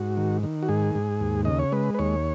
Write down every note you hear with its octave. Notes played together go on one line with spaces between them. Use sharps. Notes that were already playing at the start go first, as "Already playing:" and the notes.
Already playing: G#2 F#4
D#3
D#3
F#4
G#2 G#4
G#2
D#2
C#3 D#5
C#5
G#3 B4
B4
D#2 C#5